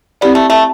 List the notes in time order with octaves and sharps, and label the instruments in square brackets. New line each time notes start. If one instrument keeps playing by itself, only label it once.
[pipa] B3 [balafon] C4 E4 G4 D5
[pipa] A3
A3